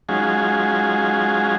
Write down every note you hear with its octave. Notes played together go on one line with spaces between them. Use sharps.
F#3 G#3 C#4 D#4 F4 G#4